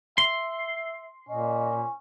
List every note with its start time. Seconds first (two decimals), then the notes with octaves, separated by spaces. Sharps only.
0.18 E5 C6
1.29 A#2 C#4 D#5